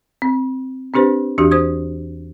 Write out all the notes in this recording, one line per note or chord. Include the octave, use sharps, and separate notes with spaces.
C4
C4 D4 G4 B4 C5
E2 E3 D4 F#4 G4 D#6
C5 D#6 G#6